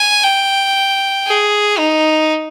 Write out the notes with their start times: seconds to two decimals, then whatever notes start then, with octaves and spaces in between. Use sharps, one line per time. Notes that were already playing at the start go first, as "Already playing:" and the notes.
Already playing: G#5
0.24 G5
1.27 G#4
1.78 D#4